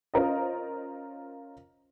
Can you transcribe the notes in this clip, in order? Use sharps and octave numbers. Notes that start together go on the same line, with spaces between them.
C#4 F4 A#4 C5 D#5